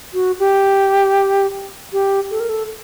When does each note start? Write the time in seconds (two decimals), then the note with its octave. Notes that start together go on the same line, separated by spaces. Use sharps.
0.14 F#4
0.39 G4
1.93 G4
2.31 A4
2.40 A#4
2.49 A4